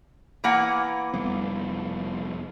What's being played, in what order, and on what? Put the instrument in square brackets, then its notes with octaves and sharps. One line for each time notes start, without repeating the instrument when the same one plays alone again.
[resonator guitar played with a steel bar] E3 A#3 F#5
[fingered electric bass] F1 G3 B3